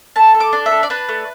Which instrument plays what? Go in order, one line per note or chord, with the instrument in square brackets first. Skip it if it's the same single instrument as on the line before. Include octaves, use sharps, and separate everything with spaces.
[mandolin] A3 A5
A4
D6
D4
E5
A4
D5
D4 B4
A3